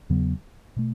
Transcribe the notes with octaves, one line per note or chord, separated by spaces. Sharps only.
E2 C#3 F#3 B3
B2 A3